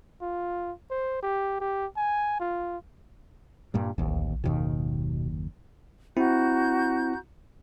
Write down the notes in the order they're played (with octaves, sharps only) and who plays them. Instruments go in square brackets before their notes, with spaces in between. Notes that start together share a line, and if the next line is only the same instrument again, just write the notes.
[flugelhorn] F4
C5
G4
G4
G#5
F4
[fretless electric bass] G2 A#2 G3
[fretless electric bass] D1 D#2 [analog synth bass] A#1
[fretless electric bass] F#1 D#2 D#3 [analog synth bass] B2
[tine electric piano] C4 E4 [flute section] F#4 A#5 G6